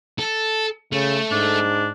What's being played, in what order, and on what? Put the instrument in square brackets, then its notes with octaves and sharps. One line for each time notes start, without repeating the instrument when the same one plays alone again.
[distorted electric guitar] A4
[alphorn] C#3 [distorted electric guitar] A3
[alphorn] G#2 [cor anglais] D4